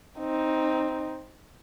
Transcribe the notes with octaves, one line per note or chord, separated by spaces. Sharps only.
C4 D#4